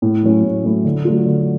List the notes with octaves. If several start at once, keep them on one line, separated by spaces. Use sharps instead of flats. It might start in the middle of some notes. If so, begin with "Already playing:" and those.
A2
F#3 A3 C#4 E4
A2
F#3 A3 C#4 E4
D3
F#3 A3 D4 F4
D3